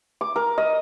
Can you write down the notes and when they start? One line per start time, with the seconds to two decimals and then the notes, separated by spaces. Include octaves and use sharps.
0.21 D6
0.36 A#4
0.58 D#5